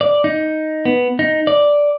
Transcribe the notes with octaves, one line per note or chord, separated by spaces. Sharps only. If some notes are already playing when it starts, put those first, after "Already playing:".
D5
D#4
B3
D#4
D5